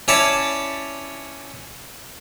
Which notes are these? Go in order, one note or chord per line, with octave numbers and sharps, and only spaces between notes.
C#4 E4 C#5 D5 A5